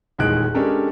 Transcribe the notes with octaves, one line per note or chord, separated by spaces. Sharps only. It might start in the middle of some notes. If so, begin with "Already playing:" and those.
D#1 E2 D#3 G#3 F#6 D7
G#3 C#4 D4 G4 A4 A#4